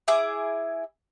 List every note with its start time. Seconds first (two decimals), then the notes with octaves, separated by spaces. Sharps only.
0.08 E4 G#4 D6